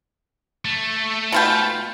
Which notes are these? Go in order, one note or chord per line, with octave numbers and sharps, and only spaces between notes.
A3
B2 F4 G5